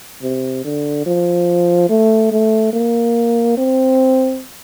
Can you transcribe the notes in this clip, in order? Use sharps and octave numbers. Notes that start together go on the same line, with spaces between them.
C3
D3
F3
A3
A3
A#3
C4